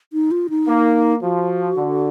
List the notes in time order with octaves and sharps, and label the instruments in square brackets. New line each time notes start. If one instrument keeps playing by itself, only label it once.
[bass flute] D#4
F4
D#4
[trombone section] A#3
[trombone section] F3 [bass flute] F#4
[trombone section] D3